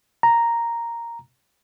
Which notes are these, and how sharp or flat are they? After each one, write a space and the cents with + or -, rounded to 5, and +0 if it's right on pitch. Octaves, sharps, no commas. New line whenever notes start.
A#5 +0